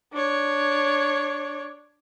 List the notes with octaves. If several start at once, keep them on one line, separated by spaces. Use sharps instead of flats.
D4 C#5